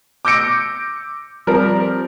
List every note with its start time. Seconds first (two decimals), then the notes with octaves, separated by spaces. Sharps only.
0.25 D6 E6 G6 A#6 C#7 D7
1.47 F3 G3 C4 A#4